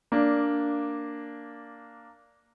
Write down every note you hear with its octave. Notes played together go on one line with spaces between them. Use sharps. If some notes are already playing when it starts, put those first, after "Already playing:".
A#3 D4